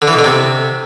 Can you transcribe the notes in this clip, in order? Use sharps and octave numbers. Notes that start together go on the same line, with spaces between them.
D3
E3
B2
D3
C3